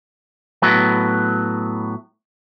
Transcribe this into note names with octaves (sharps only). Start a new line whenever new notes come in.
A2 F#3 B3